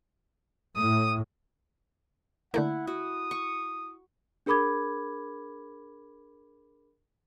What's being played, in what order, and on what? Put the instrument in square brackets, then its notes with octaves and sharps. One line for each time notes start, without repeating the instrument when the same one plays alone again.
[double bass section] A2 [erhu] D#6
[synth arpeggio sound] D3 A3 A#3 [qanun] E4 [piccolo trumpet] F#5
[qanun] F#4 [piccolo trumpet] D#6
[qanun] C#6
[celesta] D4 G#4 A#4 B5 D6 G#6